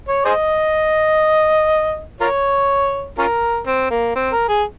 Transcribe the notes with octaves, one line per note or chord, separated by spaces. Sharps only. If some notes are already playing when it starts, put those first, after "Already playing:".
C#5
G#4 C5 D#5
F4 A#4 C#5
C#4 F4 A#4
C4
A#3
C4
A#4
G#4